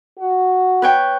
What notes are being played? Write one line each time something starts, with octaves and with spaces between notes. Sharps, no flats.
F#4
B4 C#5 G5